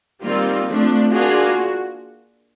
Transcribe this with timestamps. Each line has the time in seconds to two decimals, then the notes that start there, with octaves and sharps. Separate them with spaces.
0.23 D#3 G3 A#3 C4 F4
0.67 F3 A3 C4 D4
1.11 A#3 D4 F4 F#4 G#4